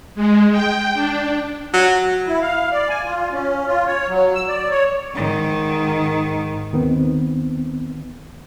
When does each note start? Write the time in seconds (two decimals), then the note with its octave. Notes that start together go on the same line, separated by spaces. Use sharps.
0.15 G#3
0.52 G5
0.94 D4
1.73 F#3
2.28 E4
2.42 F5
2.72 D5
2.89 G#5
3.06 F4
3.32 C#4
3.67 F4
3.87 C#5
4.08 F#3
4.35 E6
4.48 D5
4.70 C#5
5.13 G#2 D#3
6.73 D#2 D#3 B3 C4